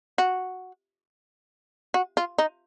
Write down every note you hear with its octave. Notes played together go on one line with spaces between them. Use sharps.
F#4
F#4
F4
D#4